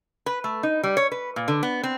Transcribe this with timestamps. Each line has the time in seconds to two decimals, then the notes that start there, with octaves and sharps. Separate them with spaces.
0.26 B4
0.44 A3
0.63 D#4
0.83 G3
0.97 C#5
1.12 B4
1.36 A#2
1.48 D3
1.63 B3
1.83 C4